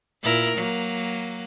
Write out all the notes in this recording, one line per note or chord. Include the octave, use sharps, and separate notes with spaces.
A#2 E4 A#4
F#3 A#3